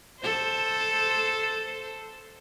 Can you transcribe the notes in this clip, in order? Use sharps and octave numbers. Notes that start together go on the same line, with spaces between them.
A4 C5